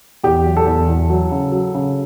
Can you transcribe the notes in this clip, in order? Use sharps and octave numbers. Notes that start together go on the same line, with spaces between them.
E2 G4
F#3
A4
E2
E2
F#3
C#3
F#3
C#3